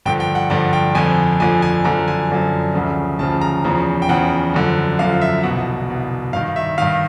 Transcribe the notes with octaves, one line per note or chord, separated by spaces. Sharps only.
G2 D3 F3 G5
G5
F#5
G2 D3 F3 F#5
G5
F2 D3 F3 G#5
F2 D3 F3 G#5
G#5
F#2 D3 F3 A#5
G#5
F#2 D3 F3
D2 C#3 F3
D2 C#3 F3 A5
A#5
E2 C#3 F3
G5
E2 C#3 F3 F#5
F#2 D3 F3
F#2 D3 F3 F5
E5
C2 B2 F#5
C2 B2
G2 D#3 F5
E5
G2 D#3 F5